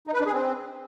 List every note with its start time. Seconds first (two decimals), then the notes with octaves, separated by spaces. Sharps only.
0.07 D#4
0.14 B4
0.20 D4
0.26 G#4
0.32 C4